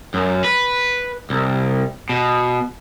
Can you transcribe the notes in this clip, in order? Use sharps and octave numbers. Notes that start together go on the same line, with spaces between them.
F#2
B4
C2
B2